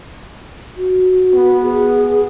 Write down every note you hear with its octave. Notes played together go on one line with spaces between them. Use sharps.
F#4
B3
G#4